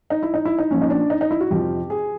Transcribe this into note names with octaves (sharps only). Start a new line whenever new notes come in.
D#4
E4
D#4
E4
D#4
A#2 F3 C#4
D#4
D4
D#4
D#4
E4
F#4
F2 C3 F3 G4
G#4